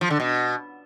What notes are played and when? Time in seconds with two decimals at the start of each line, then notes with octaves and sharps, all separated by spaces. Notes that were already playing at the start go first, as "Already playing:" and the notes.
0.01 F3
0.10 D3
0.20 B2